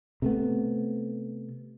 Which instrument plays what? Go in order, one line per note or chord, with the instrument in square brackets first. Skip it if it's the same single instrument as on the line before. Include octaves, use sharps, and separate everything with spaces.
[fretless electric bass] C3 A3 B3